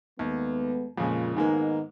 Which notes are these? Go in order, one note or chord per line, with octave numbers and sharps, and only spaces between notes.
D#2 G#3 A3 B3
F2 A#2 C#3 G#3
G#2 D#3 G#3 A#3 B3 D#4